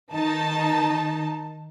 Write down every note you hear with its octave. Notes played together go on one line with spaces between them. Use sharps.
D#3 D#4 A5